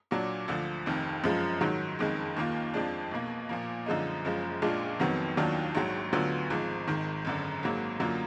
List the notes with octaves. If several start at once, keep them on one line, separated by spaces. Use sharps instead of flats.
A#2 F#3 D4
D2 D3 F3
F1 F2 D#3
F#2 F3 G#3
G#2 D#3 F#3
F#1 F2 D#3 G#3
D#2 D#3 A#3 F4
F2 F3 G#3 D4
B1 B2 A#3
A#2 F3 A#3
F#2 D3 F3 G#3 D#4
F#1 F#2 F3 G#3
A#1 A#2 G#3 D4 F4
F1 F2 D#3 F#3 B3
D#2 D#3 F#3 D4 F4
A#1 G#2 F#3
D2 D3 F#3 B3 F4
G#1 G#2 F3
G#1 G#2 D#3
G#1 F#2 D3
G#1 G#2 F#3 A#3
F#2 D3 F#3 A#3 F4